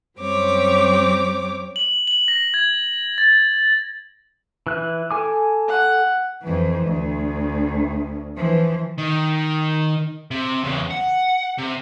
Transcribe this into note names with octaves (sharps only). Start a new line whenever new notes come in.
F#2 G3 C4 C#5 D6
F#7
F#7
A#6
G#6
A6
E3 F#6
A4 G#5 D6
F#5
F2 E3
D2
E3 F3
D#3
C3
E2 C#3
F#5
C3